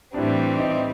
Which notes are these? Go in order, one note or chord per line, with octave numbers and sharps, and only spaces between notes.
A2 E3 G3 C4 D4
D#4